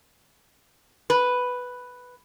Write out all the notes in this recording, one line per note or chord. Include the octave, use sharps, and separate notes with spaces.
B4